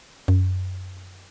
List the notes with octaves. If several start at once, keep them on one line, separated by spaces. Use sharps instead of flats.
F#2